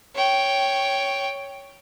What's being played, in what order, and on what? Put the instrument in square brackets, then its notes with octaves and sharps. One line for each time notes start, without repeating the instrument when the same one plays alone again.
[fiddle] C#5 G5